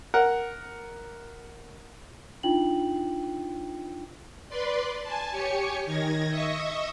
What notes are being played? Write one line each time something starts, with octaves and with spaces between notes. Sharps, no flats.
A#4 F#5
D4 D#4 F4 G5 F#7
B4 D5 C6
G#5 A5
G4 C#5 G#5 C#7
D#3 G#6 A#6
D#5 E5 C#6 D#6